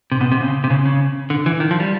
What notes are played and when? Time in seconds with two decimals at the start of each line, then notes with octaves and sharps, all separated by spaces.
0.12 C3
0.21 B2
0.32 C3
0.41 C#3
0.64 C3
0.70 C#3
0.86 C#3
1.30 D3
1.46 E3
1.60 D#3
1.71 F3
1.80 G3